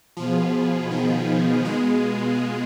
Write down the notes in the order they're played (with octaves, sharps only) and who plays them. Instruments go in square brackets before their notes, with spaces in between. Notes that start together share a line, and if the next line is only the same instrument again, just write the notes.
[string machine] B2 B3 F4 G#4 [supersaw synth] F3
[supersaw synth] D#3
G#3